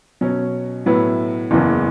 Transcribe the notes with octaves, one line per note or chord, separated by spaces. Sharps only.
B2 F#3 C#4
A2 F#3 B3 E4 B4
F#1 E2 C#3 E3